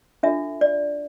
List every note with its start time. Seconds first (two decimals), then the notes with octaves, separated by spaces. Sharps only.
0.23 D4 F4 A4 E5
0.61 D5